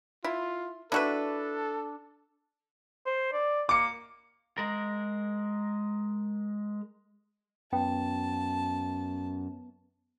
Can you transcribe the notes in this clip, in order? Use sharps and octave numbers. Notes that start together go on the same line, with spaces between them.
E4 F4
D4 E4 F#4 A4 B4
C5
D5
A#3 D6 C#7
G#3 A#4
F#2 B3 G5 A5